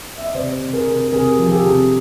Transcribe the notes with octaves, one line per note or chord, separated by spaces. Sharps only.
E5
D#5
C3 C5 D5
C3
G#4 A#4
C3
C3 G#4 A#4
F3
G#4
G4 A4
C3